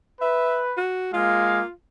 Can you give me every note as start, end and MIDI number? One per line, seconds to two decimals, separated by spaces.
0.21 0.77 71
0.21 0.61 76
0.77 1.11 66
1.14 1.61 56
1.14 1.61 58
1.14 1.71 65
1.14 1.61 77